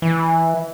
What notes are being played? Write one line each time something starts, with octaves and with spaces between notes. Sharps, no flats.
E3